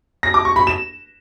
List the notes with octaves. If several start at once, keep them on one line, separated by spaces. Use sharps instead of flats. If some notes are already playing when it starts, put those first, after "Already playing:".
A#6
D6
C#6
B5
E7